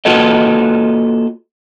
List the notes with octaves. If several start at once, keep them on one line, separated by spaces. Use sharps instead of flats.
A#3 F4 F#4 A4 B4 D#5